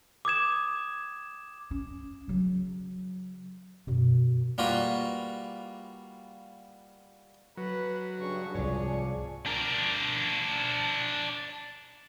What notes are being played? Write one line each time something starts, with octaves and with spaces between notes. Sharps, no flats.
D6 D#6 G#6 E7
C#4
C#3 F#3
F#2 B2
G3 A#3 F4 F#4 B4
F#3 B4
G2 C#3 C#6
C2 G#2 F3 G#4 C#5 D5
D4 A#4